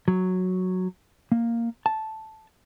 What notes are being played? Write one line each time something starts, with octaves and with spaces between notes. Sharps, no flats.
F#3
A#3
A5